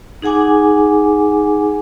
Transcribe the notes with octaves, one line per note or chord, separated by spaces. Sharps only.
D#4 G#4 F#5 G#5 D6